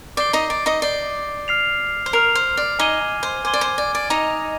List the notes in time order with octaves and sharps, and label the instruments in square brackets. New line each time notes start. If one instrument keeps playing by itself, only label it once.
[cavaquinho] D5 [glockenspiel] D6 G6 C7 G7
[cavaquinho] D#4 D#5
D5
D#4 D#5
[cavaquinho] D5 [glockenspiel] D6 G6 C7 G7
[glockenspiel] F6 C7 F7
[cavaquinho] C5
[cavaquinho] A#4 [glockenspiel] F6 C7 F7
[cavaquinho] C5
D5
[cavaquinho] D#4 D#5 [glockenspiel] G#5 D6 G#6 D#7 G7
[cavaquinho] C5
[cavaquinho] C5 [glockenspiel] G#5 D6 G#6 D#7 G7
[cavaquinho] D5
C5
D5
D5
[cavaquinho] D#4 D#5 [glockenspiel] A#5 D#6 A#6 F7